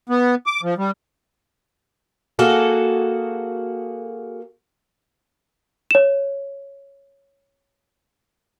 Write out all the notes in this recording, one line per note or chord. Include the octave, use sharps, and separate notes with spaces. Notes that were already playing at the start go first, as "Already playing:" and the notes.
B3
D6
F3
G3
A#3 F#4 G#4 A4
C#5 E7